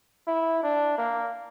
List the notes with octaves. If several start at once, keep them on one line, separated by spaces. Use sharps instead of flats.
E4
D4
A#3